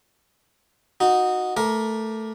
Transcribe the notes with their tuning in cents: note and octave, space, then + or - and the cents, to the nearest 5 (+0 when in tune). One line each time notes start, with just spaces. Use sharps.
D#4 +0 F#4 -15
A3 +0 A#4 +20 D6 +0